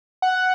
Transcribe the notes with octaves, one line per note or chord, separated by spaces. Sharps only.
F#5